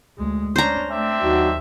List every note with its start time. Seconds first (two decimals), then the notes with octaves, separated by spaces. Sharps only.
0.18 D2 G#3
0.56 C#4 D4 C5 A#5
0.90 A3 C4 D4 E5
1.22 D#2 F#3 D#4 F#4